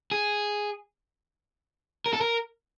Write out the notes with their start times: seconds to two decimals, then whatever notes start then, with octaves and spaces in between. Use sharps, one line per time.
0.11 G#4
2.06 A#4
2.13 A4
2.21 A#4